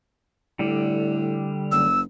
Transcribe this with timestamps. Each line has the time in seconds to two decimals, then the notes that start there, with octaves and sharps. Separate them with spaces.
0.59 A2 D3 G3
1.72 F#1 E6